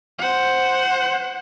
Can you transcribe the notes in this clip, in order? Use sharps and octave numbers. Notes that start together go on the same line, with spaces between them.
C5 F#5